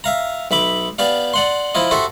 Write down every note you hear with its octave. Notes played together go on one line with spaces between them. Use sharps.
E5 F5 A#5
B1 E5 B5 D6
B3 G4 D5 F5
D5 F#5 C6
F3 E4 F4 D#5
F#4 G4 A4 C5 E5